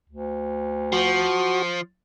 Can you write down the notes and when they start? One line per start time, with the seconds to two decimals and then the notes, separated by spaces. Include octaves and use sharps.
0.09 D2
0.93 F3 F#4